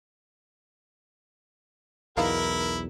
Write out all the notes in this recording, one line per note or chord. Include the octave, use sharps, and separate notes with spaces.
B1 E2 B3 D#4 E4 A#4 F5